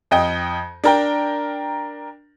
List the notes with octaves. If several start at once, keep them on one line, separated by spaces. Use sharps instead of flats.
F2 D#5 G5
D4 A#4 G5